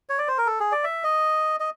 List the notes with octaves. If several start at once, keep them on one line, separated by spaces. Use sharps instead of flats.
C#5
D5
C5
A#4
A4
G#4
D5
E5
D#5
D#5